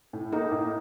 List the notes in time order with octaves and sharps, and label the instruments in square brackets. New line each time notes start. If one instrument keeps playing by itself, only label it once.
[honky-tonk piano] A2
[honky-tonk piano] A#3 [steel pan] D#4
[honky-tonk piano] A2